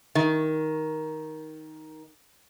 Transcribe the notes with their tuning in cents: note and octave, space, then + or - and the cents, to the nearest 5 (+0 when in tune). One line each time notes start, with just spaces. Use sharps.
D#3 +10